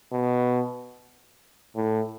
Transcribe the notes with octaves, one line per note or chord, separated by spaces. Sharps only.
B2
A2